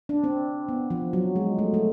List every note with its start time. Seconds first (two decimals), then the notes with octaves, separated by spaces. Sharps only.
0.09 D4
0.24 C4
0.69 B3
0.90 F3
1.13 F#3
1.36 G#3
1.59 A3
1.74 A3